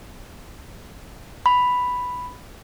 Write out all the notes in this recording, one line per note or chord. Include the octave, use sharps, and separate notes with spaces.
B5